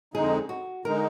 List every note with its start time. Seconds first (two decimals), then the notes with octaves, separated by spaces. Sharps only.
0.14 F2 D3 G#3 D#4 G#4
0.49 F#4
0.85 D3 G#3 D#4 A#4